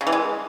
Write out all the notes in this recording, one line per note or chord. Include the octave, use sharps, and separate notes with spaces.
C#3
E3
G#3